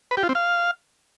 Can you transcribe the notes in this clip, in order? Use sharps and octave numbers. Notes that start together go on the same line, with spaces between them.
B4
G4
F4
C4
F5